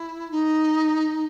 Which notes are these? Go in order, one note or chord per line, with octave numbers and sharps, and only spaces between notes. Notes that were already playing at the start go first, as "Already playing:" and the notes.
Already playing: E4
D#4